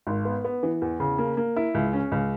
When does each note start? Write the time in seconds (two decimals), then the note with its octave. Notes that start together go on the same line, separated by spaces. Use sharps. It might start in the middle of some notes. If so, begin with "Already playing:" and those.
0.07 G#1
0.25 B3
0.44 B3
0.63 E3
0.82 E2
1.00 C#3
1.18 A#3
1.37 A#3
1.56 E4
1.74 C#2
1.93 C#4
2.12 C#2